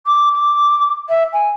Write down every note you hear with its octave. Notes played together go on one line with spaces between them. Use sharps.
D6
D6
E5
G#5